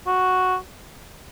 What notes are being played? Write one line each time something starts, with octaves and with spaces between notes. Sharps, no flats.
F#4